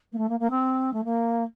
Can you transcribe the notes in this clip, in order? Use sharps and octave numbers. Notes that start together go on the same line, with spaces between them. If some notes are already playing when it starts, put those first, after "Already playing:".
A#3
A3
A#3
A#3
C4
A3
A#3